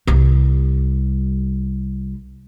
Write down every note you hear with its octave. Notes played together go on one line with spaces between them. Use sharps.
C2 G3